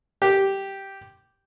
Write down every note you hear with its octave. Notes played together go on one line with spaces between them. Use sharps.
G4